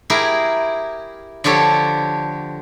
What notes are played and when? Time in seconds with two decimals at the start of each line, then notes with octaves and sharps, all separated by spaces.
0.10 E4 G4 G#4 A#4
1.44 D3 F3 G4 A4 C#5